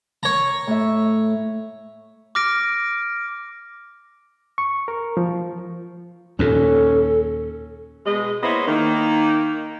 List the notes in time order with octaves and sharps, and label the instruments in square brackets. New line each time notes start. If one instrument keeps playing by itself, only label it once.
[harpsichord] C#5 A#5
[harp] A2 E5
[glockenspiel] D6 F6 A#6 D7
[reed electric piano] C#6
A#4
F3
[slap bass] D#2 A#2 [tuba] C#4 [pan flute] A4
[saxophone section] B2 G#3 D#5
A#3 B3 E4 C5 C#5 D#5
D#3 A#3